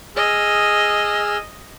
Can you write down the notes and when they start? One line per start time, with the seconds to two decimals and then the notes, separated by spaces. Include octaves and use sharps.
0.16 G#4 D#5 E6 F6